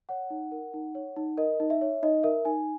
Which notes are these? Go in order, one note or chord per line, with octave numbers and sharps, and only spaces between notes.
C#5 F#5
D#4
A#4
D#4
C#5
D#4
A#4 D#5
D#4
E5
C#5
D#4 D#5
A#4 E5
D#4 G#5